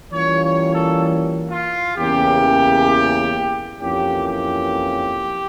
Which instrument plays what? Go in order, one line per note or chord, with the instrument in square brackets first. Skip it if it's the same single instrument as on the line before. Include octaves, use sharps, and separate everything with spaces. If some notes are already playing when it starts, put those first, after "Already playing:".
[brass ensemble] E3 G3 A#3 C#4 F4 C#5
C#5
A4
F4
E2 C#3 E3 A#3 C#4 G4
F2 E3 A#3 C#4 E4 G4
G4